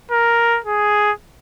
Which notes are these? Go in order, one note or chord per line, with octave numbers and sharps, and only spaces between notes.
A#4
G#4